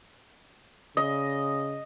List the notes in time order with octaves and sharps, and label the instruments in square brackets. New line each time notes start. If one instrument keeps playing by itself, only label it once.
[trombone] C#3 [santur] D#5